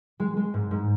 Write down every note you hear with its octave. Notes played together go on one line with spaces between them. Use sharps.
G#3
G#3
G#2
G#2